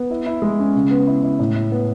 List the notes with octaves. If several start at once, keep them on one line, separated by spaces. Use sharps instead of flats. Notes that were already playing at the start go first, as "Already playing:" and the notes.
Already playing: B3
E4
E4
G#3
C#4
C#3
B3
E4
E4
A2
E4
B3